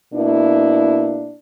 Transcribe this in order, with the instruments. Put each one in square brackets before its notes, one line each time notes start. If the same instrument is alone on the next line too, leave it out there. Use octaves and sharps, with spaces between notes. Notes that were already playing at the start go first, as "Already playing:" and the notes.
[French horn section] B2 A#3 D4 E4